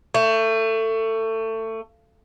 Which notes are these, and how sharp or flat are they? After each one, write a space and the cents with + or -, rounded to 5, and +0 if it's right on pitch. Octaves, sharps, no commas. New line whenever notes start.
A3 +25